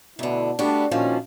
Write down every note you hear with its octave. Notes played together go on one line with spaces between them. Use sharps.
D2 B2 D3 E4
G3 A3 B3 D4 F#4
A#2 D#3 F3 C#4 D4 F#4